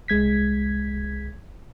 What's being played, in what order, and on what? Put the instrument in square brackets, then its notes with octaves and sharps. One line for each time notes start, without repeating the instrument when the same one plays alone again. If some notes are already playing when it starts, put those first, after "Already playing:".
[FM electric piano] C2 G#3 G#6 B6